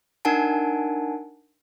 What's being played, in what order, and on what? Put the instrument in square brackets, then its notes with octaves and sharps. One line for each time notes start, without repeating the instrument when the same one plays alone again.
[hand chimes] D4 D#4 A#4 F#5 G#5 A5